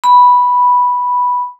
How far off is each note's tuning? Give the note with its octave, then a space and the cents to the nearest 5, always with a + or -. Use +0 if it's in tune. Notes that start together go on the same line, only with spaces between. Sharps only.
B5 -5